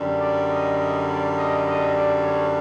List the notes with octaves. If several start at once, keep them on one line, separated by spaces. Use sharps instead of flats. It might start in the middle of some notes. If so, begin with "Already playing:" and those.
Already playing: F#2 D3 G3
D5
D#5
D#5
D5
D#5
D#5
D5
C#5